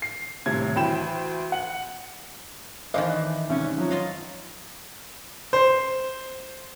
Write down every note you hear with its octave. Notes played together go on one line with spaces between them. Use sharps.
C7
D#1 A2 C3 G#6
D2 E3 G5 B5 E7
F#5 F#7
D#3 E3 D4 C5 D#5 F5
F#6
C2 G#2 C#4
F3 F#3
F4 D#5 F5
C5